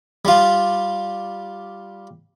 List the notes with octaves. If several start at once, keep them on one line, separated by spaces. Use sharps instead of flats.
G3 F4